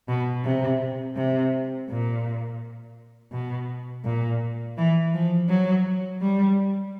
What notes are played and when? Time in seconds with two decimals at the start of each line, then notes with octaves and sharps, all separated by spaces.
0.08 B2
0.44 C3
1.16 C3
1.89 A#2
3.32 B2
4.04 A#2
4.77 E3
5.13 F3
5.49 F#3
6.21 G3